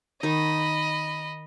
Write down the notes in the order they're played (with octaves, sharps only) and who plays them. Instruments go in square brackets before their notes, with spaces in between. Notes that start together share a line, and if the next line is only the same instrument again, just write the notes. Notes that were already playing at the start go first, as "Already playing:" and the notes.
[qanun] D#3 D#4 [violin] D#5 B5